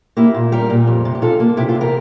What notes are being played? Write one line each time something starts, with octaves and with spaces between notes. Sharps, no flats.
A#3 E4 G4
A#2
G3 G4 A#4
A#2
F2
C3
G4
C3 F4 A4
A#3
C3 E4 G4
F4 A4
E2
G4 A#4